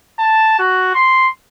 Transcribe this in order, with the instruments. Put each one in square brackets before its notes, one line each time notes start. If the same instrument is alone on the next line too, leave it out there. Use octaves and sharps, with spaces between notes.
[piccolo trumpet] A5
F#4
C6